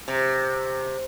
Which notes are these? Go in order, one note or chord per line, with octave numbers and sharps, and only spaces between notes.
C3